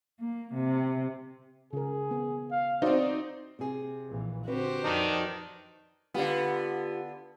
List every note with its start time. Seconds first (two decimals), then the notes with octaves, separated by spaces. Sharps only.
0.19 A#3
0.53 C3
1.73 C#3 G#4 A#4
2.11 B3
2.51 F5
2.82 C4 D#4 E4 F#4 C5 D5
3.59 C3 G#4
4.08 A#1 A#2 E3
4.48 D3 C4 F#4 G4 B4 C5
4.84 F2 D#3 D4 D#4
6.14 D3 B3 F4 G4